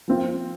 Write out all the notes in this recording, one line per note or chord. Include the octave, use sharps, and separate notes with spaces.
F3 C4 F4